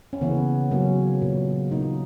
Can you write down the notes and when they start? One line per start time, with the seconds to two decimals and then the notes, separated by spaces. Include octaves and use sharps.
0.13 C#4
0.21 C#3 E3 A#3 B3
0.71 C#3 F#3 A#3 C#4
1.22 A#2 A#3
1.71 A#2 A#3 D#4